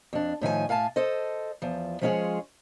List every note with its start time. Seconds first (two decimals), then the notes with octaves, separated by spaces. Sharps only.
0.13 F2 D4
0.41 A2 D#3 F3 G#5
0.69 A2 F5 G#5 A5
0.96 A4 C5 D#5
1.62 E2 F3
2.01 F3 G#3 C#4 F4 G#4 C#5